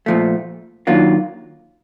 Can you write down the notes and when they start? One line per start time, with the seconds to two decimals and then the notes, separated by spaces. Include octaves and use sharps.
0.06 A#2 F3 A3
0.87 D#3 F#3 A#3 D4 F4